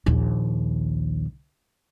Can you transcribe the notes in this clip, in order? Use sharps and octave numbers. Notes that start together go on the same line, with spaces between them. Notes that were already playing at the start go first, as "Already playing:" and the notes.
A#1 D#2